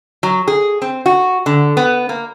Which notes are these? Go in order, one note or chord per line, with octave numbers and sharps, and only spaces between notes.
F#3
G#4
C4
F#4
D3
B3
A#3